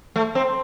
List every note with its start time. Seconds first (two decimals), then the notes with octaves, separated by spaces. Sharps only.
0.16 A3
0.35 C4